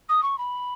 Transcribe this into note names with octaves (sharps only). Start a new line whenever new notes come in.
D#6
C#6
B5